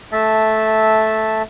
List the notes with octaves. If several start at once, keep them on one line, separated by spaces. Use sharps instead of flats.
A3 E5 A5